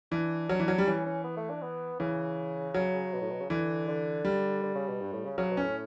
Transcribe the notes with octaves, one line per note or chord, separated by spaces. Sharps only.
E3 D4
F#3
E3
F#3
G3
E3 C#4
C#4
B3
A3
D4
B3
C#3 E3
F#3
B2
A2
B2
C#3
D3 E3
D3
G3
D3
C#3
B2
G2
A2
C#3
C#3 F#3
B2
C#4
A2